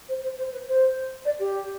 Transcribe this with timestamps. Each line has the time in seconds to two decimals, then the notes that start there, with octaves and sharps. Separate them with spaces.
0.08 C5
0.23 C5
0.38 C5
0.52 B4
0.67 C5
1.25 D5
1.39 G4